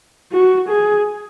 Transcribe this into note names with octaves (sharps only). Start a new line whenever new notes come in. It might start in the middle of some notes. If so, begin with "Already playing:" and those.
F#4
G#4